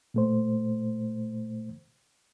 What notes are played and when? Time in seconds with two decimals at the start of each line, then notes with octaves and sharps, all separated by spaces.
0.14 A#2 A3 C5